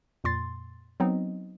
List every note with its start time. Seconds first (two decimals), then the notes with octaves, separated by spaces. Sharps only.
0.24 F2 A#2 C6 A6
1.00 F#3 B3 C4 D#4 D#5